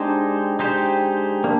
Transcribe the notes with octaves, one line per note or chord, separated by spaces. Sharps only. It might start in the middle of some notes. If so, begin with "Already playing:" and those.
Already playing: G#3 D4 D#4 G4 C5
G#3 D#4 G4 C5
A#3 D4